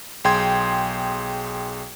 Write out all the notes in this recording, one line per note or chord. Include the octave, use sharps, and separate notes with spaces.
B1 G#4 G5 C6 G#6